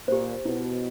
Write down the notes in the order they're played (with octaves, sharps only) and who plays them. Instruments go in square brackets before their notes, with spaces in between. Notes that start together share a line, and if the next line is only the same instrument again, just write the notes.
[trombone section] A#2 [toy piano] G4 C5
[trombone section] B2 [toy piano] E4